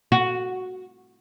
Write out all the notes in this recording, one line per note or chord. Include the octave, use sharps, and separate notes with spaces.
F#4